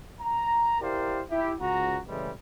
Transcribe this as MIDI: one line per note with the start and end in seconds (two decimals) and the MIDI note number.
0.20 0.79 82
0.81 1.22 64
0.81 1.22 67
0.81 1.22 70
0.81 1.22 72
0.81 1.22 74
0.81 1.22 77
1.30 1.53 64
1.30 1.53 67
1.60 1.99 37
1.60 1.99 66
1.60 1.99 82
2.08 2.31 45
2.08 2.31 49
2.08 2.31 52
2.08 2.31 55
2.08 2.31 56